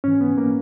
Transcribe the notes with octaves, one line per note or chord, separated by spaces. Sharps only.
G#2 E3 C#4
B3
A#3